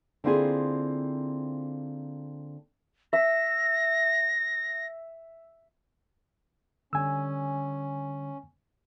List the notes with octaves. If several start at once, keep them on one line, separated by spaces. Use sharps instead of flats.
D3 A#3 C4 E4 F4 G#4
E5 A#6
D3 G3 C#4 G#5 E6